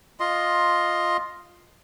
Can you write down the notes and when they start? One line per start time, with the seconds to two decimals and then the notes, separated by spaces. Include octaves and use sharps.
0.20 F4 D#5 C6